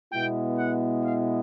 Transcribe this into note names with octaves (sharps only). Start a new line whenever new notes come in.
B2 G#3 B3 E4 G5
F#5
F5